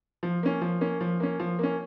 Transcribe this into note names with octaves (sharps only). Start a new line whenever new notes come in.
F3
A#3 C#4
F3
A#3 C#4
F3
A#3 C#4
F3
A#3 C#4